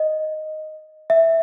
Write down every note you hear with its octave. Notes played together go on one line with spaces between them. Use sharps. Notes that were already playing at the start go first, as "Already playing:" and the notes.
Already playing: D#5
E5